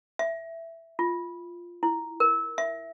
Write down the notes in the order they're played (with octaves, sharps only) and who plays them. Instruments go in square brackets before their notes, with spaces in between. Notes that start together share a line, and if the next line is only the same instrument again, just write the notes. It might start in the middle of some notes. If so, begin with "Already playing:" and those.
[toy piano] E5
F4
E4
A#4
E5